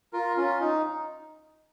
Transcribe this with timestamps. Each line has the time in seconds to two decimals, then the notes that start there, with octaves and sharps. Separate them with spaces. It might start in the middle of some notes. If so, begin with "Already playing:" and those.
0.13 F4 A#4
0.37 C#4 F4
0.61 D#4